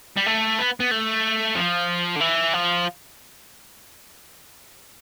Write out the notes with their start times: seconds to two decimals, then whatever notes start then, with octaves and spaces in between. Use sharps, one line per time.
0.17 G3
0.27 A3
0.59 B3
0.80 B3
0.91 A3
1.55 F3
2.16 D3
2.21 E3
2.54 F3